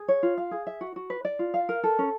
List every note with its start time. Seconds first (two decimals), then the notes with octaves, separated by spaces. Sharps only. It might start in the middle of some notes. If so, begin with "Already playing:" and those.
Already playing: G#4
0.08 C#5
0.23 F4
0.38 F5
0.51 G#4
0.67 E5
0.81 F#4
0.96 F#4
1.10 B4
1.25 D5
1.39 F4
1.54 F5
1.69 A#4
1.83 A4
1.99 C#4